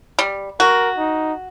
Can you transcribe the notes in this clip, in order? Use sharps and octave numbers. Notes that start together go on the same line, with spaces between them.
G3
F#4 A#4
D#4